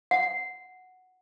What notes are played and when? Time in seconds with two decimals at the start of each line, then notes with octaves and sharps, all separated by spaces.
0.11 F#5